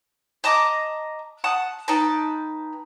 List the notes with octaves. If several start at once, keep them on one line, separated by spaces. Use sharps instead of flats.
D#5 A5 A#5 D6
F#5 A5 D#6
D#4 B4 G5 A5